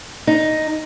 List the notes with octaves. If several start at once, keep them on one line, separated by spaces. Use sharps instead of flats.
D#4